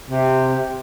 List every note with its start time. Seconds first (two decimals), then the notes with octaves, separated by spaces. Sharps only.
0.08 C3